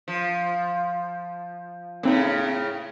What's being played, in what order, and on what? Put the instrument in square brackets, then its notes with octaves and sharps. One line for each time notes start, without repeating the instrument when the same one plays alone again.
[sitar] F3
[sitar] A2 C#3 [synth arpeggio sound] A#3 C4 D#4